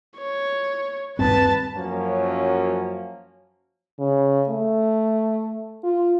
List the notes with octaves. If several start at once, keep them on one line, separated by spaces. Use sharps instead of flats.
C#5
D#1 G2 C4 B4 A5
F#2 F3 F#3 A#3 C#4
C#3
A3
F4